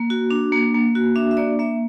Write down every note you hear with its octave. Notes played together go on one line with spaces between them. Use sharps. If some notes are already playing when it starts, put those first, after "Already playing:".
Already playing: A#3
F#4
D4
A#3
A#3
F#4
D4 E5
E5
A#3 D5
A#3 E5